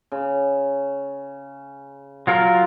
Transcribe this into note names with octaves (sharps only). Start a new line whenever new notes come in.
C#3
F#3 F4 A#4